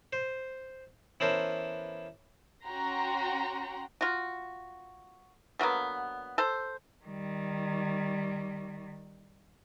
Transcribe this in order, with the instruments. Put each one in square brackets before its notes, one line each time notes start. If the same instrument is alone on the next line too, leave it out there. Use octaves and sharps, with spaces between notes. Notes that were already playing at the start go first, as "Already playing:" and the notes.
[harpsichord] C5
E3 B3 C#4 A4 A#4 C5
[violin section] C#4 F#4 F#5 G5 A#5 C6
[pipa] F4 F#4
D3 F#3 A#3 B3
A4 C5
[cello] D#3 G3